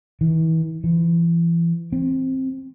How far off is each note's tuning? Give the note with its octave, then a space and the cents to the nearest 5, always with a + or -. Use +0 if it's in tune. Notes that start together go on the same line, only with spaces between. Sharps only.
E3 -35
E3 +30
C4 +10